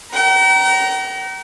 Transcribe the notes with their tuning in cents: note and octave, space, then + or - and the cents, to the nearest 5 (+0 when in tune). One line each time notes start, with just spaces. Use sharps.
G5 -45 A#5 +10